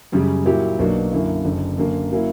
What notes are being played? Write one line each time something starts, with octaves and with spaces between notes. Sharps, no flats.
F#2 C#3 G3
A#2 F#3 A#3 E4 G4
B1 B2 F#3 A#3 D4
F#2 D3 A#3 E4
F#1 F#2 D3
F#2 D3 A#3
F#3 A#3 C#4 E4